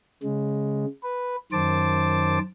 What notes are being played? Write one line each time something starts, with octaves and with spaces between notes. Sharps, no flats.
C#3 G#3
B4
F#2 D#3 C5 A5 D6